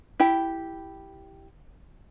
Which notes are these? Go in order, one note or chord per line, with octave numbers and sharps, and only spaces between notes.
E4 G4 G5